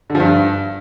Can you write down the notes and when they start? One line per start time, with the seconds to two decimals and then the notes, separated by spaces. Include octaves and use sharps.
0.10 D3
0.15 F3
0.20 G2